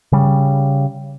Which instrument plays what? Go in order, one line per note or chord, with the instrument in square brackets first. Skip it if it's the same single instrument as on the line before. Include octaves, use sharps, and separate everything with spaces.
[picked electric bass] C#3 G3